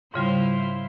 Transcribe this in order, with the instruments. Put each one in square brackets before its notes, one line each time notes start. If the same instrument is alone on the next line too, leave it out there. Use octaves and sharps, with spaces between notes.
[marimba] G#2 C#3 G3 [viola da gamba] E4 F4 C5